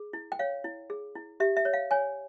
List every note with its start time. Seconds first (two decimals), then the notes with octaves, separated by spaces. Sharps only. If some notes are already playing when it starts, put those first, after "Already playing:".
Already playing: G#4
0.13 E4
0.32 G5
0.39 C#5 F5
0.64 E4
0.90 G#4
1.15 E4
1.40 G4 E5
1.57 E5
1.65 C#5
1.73 F5
1.91 C#5 G#5